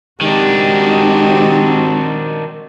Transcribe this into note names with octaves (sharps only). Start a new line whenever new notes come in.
D#3 G#3 C4 D4 D#4 F#4 G4